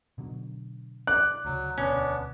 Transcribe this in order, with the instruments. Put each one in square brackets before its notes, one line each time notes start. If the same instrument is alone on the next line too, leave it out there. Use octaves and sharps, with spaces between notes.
[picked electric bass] B2 D3 F#3
[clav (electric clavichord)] D5 [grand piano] F#6
[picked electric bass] D2 C#3 [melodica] F#3
[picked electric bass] E1 D2 B2 [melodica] B3 D4 [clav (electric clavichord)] C#4